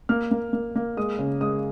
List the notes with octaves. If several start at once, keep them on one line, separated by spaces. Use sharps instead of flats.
A#3 F6
A#3
A#3
A#3
G#3 D#6
C#3
G#3 D#6